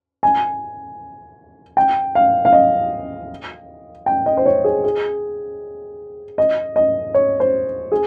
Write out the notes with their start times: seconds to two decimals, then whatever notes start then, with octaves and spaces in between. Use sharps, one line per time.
0.23 G#5
1.77 G5
2.15 F5
2.45 F5
2.53 D#5
4.06 G5
4.26 D#5
4.37 C5
4.46 C#5
4.64 G#4
4.84 G#4
6.38 D#5
6.76 D#5
7.14 C#5
7.40 C5
7.92 G#4